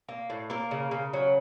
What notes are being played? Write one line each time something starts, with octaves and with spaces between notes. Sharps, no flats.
A#3
A2
A#3 A#4
C#3
C#3
F#3